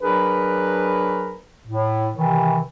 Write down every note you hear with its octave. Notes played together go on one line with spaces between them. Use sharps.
F#3 D4 G#4 A#4 B4
A2
C3 D#3 E3